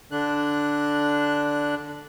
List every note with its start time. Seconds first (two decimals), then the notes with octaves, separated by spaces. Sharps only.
0.11 D3 D4 F#6